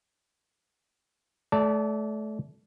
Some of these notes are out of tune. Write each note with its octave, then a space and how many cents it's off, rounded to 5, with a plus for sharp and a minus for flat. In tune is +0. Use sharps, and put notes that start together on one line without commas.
A3 -30 D5 -30 A5 +15